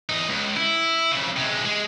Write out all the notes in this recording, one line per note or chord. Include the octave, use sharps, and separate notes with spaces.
E2 D#4
C#2
E4
F2 C#3
C3 G#3
G#3 G#4